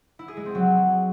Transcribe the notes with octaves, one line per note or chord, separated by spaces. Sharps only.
E4
G#4
G#3
C4
F#3